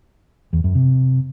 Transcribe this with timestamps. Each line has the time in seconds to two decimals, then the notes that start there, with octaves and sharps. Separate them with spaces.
0.53 E2
0.64 F#2
0.75 C3